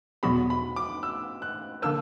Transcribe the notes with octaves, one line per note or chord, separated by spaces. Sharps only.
E2 B2 F#3 B3 F#4 B5
B5
D6
E6
F#6
D3 A#3 D4 A#4 E6